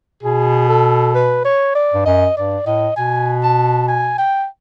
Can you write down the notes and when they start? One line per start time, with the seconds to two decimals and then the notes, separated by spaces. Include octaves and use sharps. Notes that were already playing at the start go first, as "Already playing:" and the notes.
0.23 B2 G#4
0.69 A4
1.15 B4
1.45 C#5
1.75 D5
1.94 G2
2.05 F#2 D#5
2.36 G2 D5
2.66 A2 D#5
2.97 B2 G#5
3.43 A5
3.88 G#5
4.18 G5